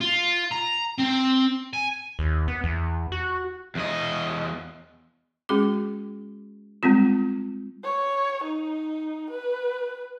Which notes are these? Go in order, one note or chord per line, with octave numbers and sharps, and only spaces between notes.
F4
A#5
C4
G#5
D#2
B3
E2
F#4
E2 D#5
G#3 C#4 F#4 G#4 D6
G3 G#3 B3 C4 F4
C#5
D#4
B4